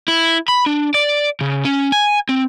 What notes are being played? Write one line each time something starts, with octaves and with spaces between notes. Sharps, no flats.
E4
B5
D4
D5
C#3
C#4
G#5
C4